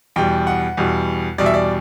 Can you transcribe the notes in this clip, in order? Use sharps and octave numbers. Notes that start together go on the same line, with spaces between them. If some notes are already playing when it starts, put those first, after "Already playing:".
E2 B2 G3 G5
F#5
E2 B2 G3
E2 B2 G3 D5
E5
D5